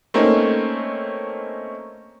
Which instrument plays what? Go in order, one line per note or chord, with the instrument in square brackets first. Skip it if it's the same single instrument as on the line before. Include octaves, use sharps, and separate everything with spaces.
[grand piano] A3 A#3 C4 C#4 D#4